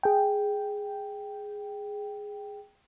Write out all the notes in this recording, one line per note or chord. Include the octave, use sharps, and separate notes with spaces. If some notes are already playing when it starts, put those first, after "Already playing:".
G#4 G5